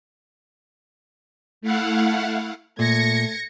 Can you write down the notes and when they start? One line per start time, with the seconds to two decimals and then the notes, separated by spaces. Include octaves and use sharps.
1.61 A3 E4 F5 F#5
2.79 A#2 A3 G#6 A#6 C#7